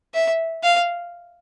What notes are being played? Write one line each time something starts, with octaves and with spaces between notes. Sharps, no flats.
E5
F5